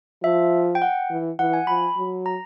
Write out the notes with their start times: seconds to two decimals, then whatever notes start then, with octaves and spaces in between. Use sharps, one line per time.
0.23 F3 E5
0.75 G5
0.82 F#5
1.10 E3
1.39 E3 F#5
1.53 G#5
1.67 F3 B5
1.97 F#3
2.26 A#5